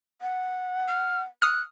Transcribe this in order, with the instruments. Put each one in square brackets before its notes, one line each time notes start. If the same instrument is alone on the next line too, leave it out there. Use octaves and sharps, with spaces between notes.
[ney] F#5
[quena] F6
[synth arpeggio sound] D#6 F6 [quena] F#6